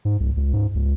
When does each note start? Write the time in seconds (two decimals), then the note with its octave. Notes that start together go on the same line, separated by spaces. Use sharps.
0.05 G#2
0.20 C2
0.37 C#2
0.53 G#2
0.75 C#2